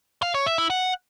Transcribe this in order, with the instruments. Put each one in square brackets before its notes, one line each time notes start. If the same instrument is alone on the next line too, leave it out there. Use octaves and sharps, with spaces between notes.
[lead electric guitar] F5
C#5
E5
E4
F#5